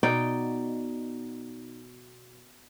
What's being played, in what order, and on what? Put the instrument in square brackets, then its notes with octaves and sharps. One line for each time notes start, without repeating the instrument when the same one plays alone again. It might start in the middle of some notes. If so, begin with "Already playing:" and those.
[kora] B2 D#4 D5 G5